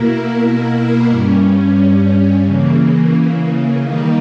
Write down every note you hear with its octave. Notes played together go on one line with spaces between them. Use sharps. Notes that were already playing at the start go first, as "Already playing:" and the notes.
Already playing: B2 A#3 E4 A#4
G2 G3 C#4
C#3 E3 A#3
D#3 G3 A#3 D#4